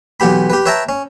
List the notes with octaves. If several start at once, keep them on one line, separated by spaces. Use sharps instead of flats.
B1 E3 B3 G4 B5
G4 B4
B4 C#5 E5 G5 A5 A#5
C#4